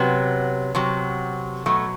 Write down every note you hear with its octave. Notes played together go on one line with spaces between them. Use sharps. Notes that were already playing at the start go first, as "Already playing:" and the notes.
Already playing: C3 F#3 B3
C3 F#3
B2 F#3 A3